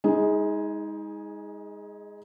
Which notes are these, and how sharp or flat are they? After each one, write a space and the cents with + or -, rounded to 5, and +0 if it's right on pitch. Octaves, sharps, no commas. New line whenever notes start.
G#3 -20 D#4 +30 G#4 +0